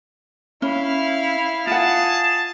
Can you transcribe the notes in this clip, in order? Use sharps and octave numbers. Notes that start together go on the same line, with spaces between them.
C#4 E4 F5
F4 G#4 F#5 A5